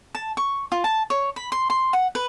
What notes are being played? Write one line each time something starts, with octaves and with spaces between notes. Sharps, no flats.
A5
C#6
F4
A5
C#5
B5
C6
C6
F#5
B4